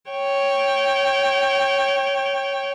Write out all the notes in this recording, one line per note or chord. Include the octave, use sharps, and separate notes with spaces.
C#5 G5